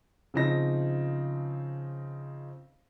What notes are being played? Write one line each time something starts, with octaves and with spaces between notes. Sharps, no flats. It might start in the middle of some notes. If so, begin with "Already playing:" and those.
C#3 F3 C4 D#4 A#6